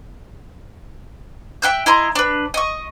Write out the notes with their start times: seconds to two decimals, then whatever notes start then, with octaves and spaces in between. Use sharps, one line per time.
1.62 E5 G5 F#6 G6
1.86 E4 D#5 A#5 C6
2.15 D4 B4
2.54 D#5 C#6